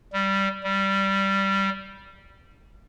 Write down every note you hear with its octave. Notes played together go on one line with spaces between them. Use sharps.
G3
G3